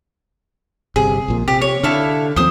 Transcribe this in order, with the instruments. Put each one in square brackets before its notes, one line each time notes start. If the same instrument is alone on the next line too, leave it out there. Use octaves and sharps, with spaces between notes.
[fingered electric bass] G1 C3 [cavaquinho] G#4
[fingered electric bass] A#1 A#2
[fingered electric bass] C3 [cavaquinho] G4
[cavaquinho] C#5
[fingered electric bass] D3 [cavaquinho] E4 A4 F5
[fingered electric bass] D#2 F3 C4 [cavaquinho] C5 D#6